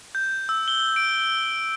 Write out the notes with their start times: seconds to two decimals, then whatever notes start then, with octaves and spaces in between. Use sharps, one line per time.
0.15 G6
0.49 E6
0.68 G7
0.96 D7